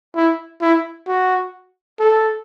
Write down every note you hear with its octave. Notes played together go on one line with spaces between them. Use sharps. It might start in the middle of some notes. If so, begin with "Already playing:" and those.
E4
E4
F#4
A4